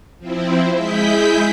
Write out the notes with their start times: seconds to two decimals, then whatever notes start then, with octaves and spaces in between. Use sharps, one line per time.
0.19 F3 C4 E4
0.74 G#3 E4 G#4 G6 B6